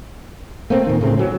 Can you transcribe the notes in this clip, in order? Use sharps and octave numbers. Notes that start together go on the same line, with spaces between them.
A3 A#3 C4
A#2 D#3
A2 C#3 A3 C4
F#3 C#4